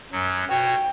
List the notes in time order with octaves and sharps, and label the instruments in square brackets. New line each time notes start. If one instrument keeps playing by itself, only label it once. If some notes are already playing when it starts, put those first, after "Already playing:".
[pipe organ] F#2 F#3
[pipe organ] B2 F#4 C#5 [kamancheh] G5